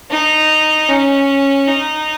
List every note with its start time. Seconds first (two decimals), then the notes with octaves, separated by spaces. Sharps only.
0.11 D#4
0.88 C#4
1.68 D#4